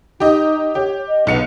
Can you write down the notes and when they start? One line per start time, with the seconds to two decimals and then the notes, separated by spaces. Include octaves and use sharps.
0.20 D#4 G4 D#5
0.75 G4 C#5
1.08 D#5
1.27 B1 B3 C#7 F7